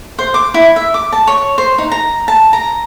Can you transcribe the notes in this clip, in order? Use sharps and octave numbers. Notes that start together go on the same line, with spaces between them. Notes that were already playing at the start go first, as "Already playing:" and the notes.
C5
D6
E4
E5
D6
A5
C#5
C5
D#4
A#5
A5
A#5